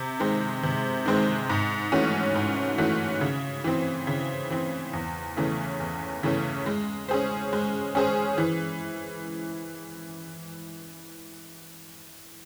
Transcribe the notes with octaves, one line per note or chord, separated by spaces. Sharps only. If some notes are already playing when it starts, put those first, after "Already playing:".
Already playing: C3
D#3 G#3 C4
C3
D#3 G#3 C4
G#2
E3 A3 C#4 F#4
G#2
E3 A3 C#4 F#4
C#3
E3 C4
C#3
E3 C4
E2
C#3 E3 A3 C#4
E2
C#3 E3 A3 C#4
G#3
C#4 G#4 C5
G#3
C#4 G#4 C5
E3